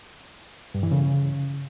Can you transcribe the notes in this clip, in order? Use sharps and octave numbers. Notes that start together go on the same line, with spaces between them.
G2
E3
C#3